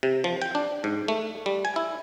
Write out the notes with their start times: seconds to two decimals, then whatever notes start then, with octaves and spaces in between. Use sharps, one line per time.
0.03 C3
0.24 F3
0.42 G5
0.55 D4
0.84 G#2
1.08 A3
1.46 G3
1.65 G#5
1.76 E4